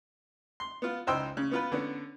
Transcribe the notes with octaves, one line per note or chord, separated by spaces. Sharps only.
C6
B3 F4
C#2 D#4 C5 G5 C6 E6
C#3
B3 F4 B4
D3 B3 C#4